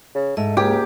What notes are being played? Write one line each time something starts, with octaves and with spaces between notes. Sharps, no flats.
C#3
G#2 A3 D#5
C#2 A#3 G4 G#4